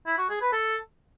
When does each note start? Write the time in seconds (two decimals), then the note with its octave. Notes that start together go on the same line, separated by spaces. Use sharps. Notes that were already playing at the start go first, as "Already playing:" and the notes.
0.07 E4
0.18 F#4
0.30 G#4
0.41 B4
0.53 A4